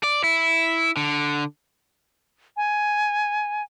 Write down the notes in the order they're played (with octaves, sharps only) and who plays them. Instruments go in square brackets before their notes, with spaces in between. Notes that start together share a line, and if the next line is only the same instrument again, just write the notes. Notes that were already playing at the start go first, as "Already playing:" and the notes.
[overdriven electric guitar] D5
E4
D3
[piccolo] G#5